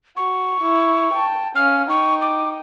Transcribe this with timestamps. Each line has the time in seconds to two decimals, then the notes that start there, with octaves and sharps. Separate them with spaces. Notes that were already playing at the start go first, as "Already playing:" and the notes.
0.17 F#4 C#6
0.61 E4
1.14 G5 A5
1.56 C#4 F5 F6
1.90 D#4 G5 C#6
2.22 D6